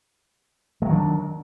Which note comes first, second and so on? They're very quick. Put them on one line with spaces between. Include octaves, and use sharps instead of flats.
G#3 F#3 D#3 D4